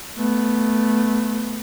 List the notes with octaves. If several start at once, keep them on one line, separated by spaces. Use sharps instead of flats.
A3 B3